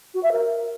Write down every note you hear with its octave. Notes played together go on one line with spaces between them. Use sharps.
F#4
E5
A#4